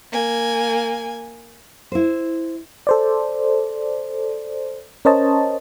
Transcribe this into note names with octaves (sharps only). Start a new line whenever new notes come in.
A#3 G#5
E4 C5
A4 C5 D5
C#4 A#4 C5 C#5 D#5 A5